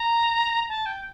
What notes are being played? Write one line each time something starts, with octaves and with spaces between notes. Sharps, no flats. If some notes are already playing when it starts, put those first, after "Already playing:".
Already playing: A#5
A5
G5